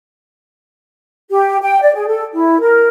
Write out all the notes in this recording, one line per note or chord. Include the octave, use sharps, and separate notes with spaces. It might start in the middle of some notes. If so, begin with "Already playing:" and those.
G4
G5
D5
G#4
A4
E4
A#4